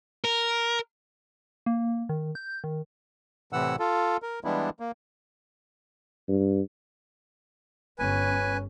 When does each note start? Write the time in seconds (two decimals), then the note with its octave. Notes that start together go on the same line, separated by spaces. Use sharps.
0.24 A#4
1.66 A#3
2.09 D#3
2.35 G6
2.64 D#3
3.53 A2 C3 E3 F#5 E6
3.79 F4 A4
4.22 A#4
4.44 E3 G3 G#3 B3 D4 E4
4.80 A#3
6.29 G2
7.99 G1 C#4 B4 G#5